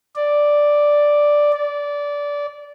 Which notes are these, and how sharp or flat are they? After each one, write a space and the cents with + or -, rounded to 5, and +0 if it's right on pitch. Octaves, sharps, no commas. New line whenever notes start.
D5 +0
D5 -20